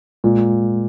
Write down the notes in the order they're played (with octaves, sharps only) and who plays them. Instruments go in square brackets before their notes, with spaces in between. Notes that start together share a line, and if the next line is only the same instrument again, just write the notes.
[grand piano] A#2 [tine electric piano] G#3